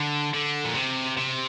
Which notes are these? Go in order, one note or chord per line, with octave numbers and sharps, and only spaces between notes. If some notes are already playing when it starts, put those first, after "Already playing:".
Already playing: D3
D3
A#2
C3
C3